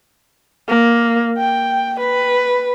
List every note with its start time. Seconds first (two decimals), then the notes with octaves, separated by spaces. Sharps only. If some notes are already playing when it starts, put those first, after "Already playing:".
0.68 A#3
1.38 G5
2.00 B4